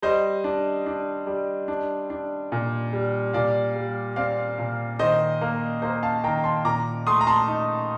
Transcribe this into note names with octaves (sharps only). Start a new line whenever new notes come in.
G3 C5 D#5
D4
D4
G3
D4
D4
A#2
G3
A#2 D5 F5
G3
C4 D5 F5
A#2
D#3 C5 D#5
A#3
A#3 C5
F5 A5
D#3 G5 A#5
A5 C6
A#2 A#5 D6
A3 C6 D#6
A#5
A5 C6
D#4